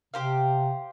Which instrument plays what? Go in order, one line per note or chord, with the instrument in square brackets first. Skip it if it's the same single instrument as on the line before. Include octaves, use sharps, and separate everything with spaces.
[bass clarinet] C3 [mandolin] G4 C5 F5